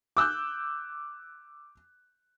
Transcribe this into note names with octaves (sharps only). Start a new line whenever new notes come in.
D6 E6 F#6 G6